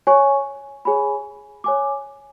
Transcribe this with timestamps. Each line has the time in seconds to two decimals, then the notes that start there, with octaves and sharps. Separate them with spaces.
0.07 C#5 G#5 C#6
0.85 G#4 C#5 G#5 B5
1.64 C#5 G#5 D6